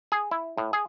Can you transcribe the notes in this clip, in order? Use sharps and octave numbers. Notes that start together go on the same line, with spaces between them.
G#4
E4
A2
G#4